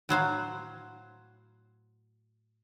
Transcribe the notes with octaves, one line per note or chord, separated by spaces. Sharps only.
A2 F#3 C5 F5